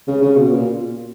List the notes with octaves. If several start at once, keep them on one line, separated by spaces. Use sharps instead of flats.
C#3
C#3
B2
A#2